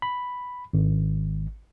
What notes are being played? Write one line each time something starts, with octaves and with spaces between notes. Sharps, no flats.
B5
G#1